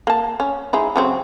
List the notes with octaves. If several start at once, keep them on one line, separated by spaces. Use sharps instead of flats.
A#3 A5
C#4
G#3 D#4 E4
C#3 F#3 C4